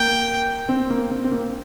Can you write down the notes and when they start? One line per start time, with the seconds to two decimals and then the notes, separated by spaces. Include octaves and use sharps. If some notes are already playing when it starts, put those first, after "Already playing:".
Already playing: A#3 G5
0.69 C4
0.90 A#3
1.11 C4
1.24 C4
1.31 A#3